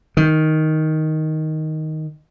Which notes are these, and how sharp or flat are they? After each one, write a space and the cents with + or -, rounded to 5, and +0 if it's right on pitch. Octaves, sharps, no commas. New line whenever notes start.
D#3 +5